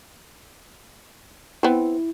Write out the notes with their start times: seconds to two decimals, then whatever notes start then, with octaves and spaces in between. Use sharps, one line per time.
1.63 B3 C4 E4